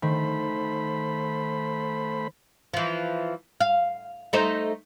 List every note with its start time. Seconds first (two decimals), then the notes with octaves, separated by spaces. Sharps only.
0.02 D#3 A3 C5 B5
2.74 E3 F3
3.60 F5
4.33 A3 D#4 C5